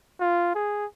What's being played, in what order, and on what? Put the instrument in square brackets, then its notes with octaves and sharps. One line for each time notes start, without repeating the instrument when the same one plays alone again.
[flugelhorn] F4
G#4